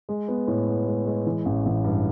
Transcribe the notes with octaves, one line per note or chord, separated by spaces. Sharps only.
G#3
B3
A2
B3
G#3
G#3
E3
A1
A1
G2